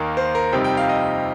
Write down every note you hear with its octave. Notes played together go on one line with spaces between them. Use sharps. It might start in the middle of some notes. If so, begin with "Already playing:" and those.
Already playing: D#2 D#3 A#3 A#4
C5
A#4
F2 C3 G3 C4 D#4 G5
G5
F5
D#5